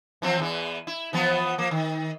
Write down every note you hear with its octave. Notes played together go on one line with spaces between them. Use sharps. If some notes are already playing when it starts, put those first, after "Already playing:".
E3 F3 C4
E2 E3
E4
E3 F3 B3
F3 A#3
D#3